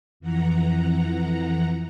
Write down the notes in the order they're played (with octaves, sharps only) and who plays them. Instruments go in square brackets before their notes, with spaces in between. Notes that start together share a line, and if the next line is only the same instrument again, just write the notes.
[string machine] F2 E3 F#5 A#5